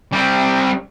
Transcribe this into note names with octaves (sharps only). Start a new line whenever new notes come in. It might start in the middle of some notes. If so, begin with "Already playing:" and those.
G3 C4